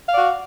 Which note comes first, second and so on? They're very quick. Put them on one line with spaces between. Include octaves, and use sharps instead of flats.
F5 D5 F#4